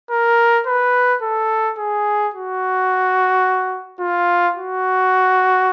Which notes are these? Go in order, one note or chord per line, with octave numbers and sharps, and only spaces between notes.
A#4
B4
A4
G#4
F#4
F4
F#4